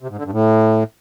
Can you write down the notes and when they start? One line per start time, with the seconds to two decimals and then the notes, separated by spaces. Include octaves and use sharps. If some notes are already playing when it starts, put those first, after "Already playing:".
0.02 C3
0.10 G#2
0.17 D3
0.25 G2
0.32 A2